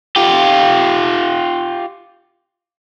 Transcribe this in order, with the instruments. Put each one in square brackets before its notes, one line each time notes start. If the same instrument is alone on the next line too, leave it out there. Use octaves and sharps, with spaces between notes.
[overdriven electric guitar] F4 G4